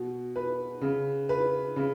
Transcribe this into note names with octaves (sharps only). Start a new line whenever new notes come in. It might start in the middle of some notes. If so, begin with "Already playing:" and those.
Already playing: B2
B4
C#3
B4
C#3